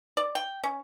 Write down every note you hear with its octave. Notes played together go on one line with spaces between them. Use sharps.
D5
G5
C#4